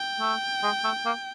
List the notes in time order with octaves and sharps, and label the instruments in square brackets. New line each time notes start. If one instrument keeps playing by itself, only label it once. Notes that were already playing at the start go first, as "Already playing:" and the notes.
Already playing: [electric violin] G5
[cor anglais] A3
G#3
A3
A#3